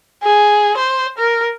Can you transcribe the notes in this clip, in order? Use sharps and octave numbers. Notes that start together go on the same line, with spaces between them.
G#4
C5
A#4